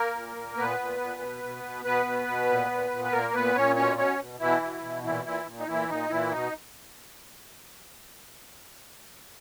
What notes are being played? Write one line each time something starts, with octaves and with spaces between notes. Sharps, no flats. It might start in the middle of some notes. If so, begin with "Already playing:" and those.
Already playing: A#3 A#4
A#2
A#2
A#2 B3 B4
A#2
A#2
B2
B2
B2
B2 B3 B4
B2
B2
A#2
A#2
A#2
B4
A#2 A#3 A#4
A#2 B3 B4
A#2 C#4 C#5
B2 C#4 C#5
B2 C#4 C#5
B2
B2 E3 E4
B2
B2
A#2 E3 E4
A#2 E3 E4
A#2
D#4
A#2 E3 E4
A#2 D#4
A#2 E3 E4
B2 D#4